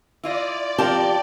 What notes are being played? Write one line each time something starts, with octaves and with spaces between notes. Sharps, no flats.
E4 F4 D5 D#5
F3 C4 G4 A#4 A5